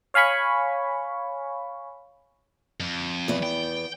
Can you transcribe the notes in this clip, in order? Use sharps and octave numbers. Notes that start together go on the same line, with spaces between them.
C#5 F5 G#5 B5 C#6
F2
E2 B3
G5